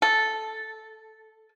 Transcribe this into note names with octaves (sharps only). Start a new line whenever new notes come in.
A4